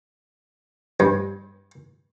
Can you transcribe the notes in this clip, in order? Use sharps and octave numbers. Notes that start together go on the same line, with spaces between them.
G2